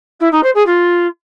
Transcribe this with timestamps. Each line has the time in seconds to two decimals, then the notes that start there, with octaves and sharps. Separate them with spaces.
0.20 E4
0.31 D#4
0.43 C5
0.54 G#4
0.66 F4